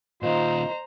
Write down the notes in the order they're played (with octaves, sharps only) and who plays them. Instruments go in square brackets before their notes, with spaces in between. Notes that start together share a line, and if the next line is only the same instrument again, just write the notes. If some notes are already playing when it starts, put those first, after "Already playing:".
[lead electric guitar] A#2 D#3 [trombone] F4 [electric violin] C5 A#5 [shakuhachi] D#5